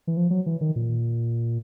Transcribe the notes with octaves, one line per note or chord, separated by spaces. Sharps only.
E3
F3
F#3
E3
D#3
A#2